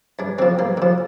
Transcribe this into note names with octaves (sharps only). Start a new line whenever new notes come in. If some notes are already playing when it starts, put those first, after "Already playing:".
G2 D4
D3 F3 C4
G2 A#3
D3 F3